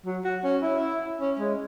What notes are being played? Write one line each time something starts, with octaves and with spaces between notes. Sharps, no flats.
F#3
F#4
C#4
E4
C#4
G#3